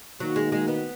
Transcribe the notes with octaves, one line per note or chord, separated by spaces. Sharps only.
D#3 F#3 A#3 D#4 F#4
G#3
G#3
B3